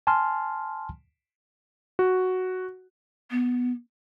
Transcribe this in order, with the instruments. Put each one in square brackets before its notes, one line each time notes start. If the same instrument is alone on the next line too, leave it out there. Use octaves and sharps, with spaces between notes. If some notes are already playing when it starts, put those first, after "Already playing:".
[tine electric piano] G#5 A5 C6 F6
[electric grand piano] F#4
[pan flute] B3